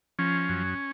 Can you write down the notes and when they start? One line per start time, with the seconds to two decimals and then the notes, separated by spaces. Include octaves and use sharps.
0.19 F3 C#4
0.49 F#2